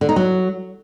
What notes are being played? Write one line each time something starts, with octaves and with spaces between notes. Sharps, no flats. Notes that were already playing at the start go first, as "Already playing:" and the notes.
D3
D#4
F#3